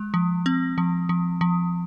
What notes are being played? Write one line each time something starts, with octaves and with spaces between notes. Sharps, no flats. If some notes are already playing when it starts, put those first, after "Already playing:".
Already playing: G#3
F3
C4
F3
F3
F3